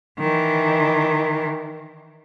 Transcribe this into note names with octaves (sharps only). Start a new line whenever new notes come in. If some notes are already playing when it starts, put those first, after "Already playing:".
D#3 E3